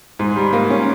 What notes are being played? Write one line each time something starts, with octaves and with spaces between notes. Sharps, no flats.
G#2
G3
A#3
C#4